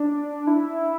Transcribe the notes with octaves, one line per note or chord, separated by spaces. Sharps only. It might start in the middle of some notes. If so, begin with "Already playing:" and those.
Already playing: D4
E4